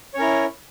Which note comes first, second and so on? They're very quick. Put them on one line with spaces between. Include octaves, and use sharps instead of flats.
C#5 C#4 A#4 E4